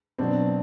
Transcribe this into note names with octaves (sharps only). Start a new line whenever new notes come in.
B2 F#3 C4 D4